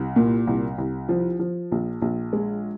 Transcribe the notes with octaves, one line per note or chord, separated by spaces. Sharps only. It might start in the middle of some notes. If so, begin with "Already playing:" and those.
Already playing: C2
A#2
C2
C2
F3
F3
A#1
A#1
G#3